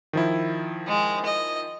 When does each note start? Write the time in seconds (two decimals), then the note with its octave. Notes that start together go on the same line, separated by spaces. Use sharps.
0.13 D#3 F3 E4
0.87 G#3
1.26 D#5